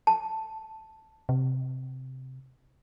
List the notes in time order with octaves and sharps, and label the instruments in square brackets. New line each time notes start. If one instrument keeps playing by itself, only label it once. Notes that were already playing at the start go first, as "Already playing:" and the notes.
[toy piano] A5
[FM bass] C3